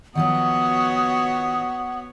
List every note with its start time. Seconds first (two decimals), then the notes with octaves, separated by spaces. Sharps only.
0.15 D#3 F3 F#3 B3 F#4 C#5 F#5 D#6